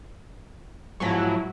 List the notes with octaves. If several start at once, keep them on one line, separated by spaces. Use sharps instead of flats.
E2 G#2 F3 F#3 E4